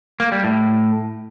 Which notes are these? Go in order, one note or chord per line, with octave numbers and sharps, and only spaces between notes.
A#3
G3
A2